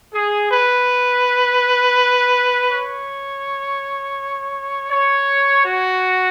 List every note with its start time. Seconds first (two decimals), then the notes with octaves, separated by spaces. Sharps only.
0.14 G#4
0.51 B4
2.71 C#5
4.91 C#5
5.64 F#4